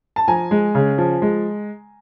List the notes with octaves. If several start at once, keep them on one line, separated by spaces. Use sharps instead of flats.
A5
F3 G#5 A#5
G#3
C#3
F3
G#3